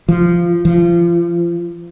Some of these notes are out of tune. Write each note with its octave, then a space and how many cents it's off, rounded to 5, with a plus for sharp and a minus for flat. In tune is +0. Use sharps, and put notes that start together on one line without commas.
F3 -15
F3 -30